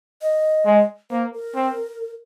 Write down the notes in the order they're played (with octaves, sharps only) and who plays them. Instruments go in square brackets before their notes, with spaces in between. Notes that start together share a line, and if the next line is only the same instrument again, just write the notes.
[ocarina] D#5
[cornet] G#3
[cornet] A#3 [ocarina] C5
[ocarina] A#4
[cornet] C4